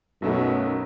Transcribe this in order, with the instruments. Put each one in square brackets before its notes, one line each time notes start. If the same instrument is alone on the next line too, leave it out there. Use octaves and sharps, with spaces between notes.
[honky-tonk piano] B1 F#3 A3 [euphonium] F#2 [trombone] B2